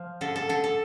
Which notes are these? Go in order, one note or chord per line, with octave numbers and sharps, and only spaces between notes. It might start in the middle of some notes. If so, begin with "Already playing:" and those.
Already playing: F3
D3 A4
A4
D3 A4
A4